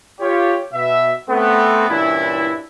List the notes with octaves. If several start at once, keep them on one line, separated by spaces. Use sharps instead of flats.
F4 G4 C#5
B2 E5
A3 B3 C4
G2 A#2 E3 C#4 D4 E4